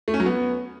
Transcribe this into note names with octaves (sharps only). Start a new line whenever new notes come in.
A3
C#4
F#3
B3